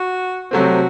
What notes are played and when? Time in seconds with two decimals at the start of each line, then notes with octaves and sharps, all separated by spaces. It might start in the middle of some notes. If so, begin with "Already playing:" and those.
Already playing: F#4
0.51 C3 F#3 A3 C4 F#4